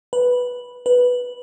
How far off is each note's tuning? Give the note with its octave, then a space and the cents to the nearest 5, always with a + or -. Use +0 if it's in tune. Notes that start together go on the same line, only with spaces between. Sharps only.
B4 -5
B4 -5